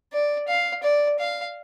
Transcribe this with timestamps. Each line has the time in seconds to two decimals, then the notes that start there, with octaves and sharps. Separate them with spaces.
0.13 D5
0.48 F5
0.83 D5
1.19 F5